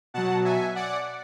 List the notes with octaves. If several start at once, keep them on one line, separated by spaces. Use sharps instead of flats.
B2 F#3 F#5 A5
E5 G#5
D5 F#5